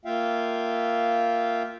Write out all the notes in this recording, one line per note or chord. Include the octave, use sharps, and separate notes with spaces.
A#3 F4 E5 F5 G5